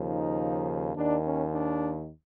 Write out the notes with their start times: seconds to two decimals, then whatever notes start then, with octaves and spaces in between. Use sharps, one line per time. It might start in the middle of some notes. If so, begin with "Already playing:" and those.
Already playing: D#2 C#3 F3
0.09 D#4
0.95 D#2 D#3 D4
1.24 C#4
1.52 D4